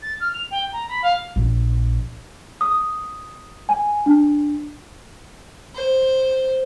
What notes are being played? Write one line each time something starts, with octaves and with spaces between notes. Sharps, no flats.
A6
F6
F7
G5
A#5
B5
F5
A#1
D#6
G#5
D4
C5